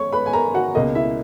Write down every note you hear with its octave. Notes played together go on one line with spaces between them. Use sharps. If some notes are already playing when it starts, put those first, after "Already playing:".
Already playing: C#5 C#6
B4 B5
G#5
A#4 A#5
F#4 F#5
C#2 B2 A#3 D#5
E4 E5